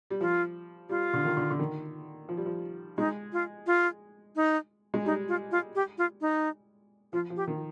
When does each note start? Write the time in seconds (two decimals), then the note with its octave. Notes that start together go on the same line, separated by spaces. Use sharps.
0.10 G3
0.21 F3 F4
0.89 G3 F4
1.14 D3
1.25 D#3
1.37 D3
1.50 D3
1.59 D#3
2.29 F3
2.37 G3
2.46 F3
2.98 G#3 D#4
3.33 F4
3.67 F4
4.36 D#4
4.94 G#3
5.05 G3 D#4
5.28 F4
5.51 F4
5.75 G4
5.98 F4
6.21 D#4
7.13 F3 F4
7.30 F3
7.36 G4
7.47 D#3